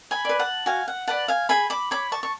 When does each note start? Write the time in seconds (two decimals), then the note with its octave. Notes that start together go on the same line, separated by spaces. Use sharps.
0.11 G#5 B5
0.25 B4 D5
0.39 F#5 A5
0.66 F#4 F5 G#5
0.88 F#5
1.08 B4 D5 F#5 A5
1.28 F5 G#5
1.49 G#4 G#5 B5
1.70 B5 D6
1.91 C#5 B5 D6
2.12 A5 C#6
2.23 C#6